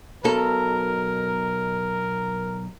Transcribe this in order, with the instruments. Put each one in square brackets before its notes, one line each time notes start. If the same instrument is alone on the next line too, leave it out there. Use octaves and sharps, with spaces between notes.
[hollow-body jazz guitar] B1 B2 A4 [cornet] A#4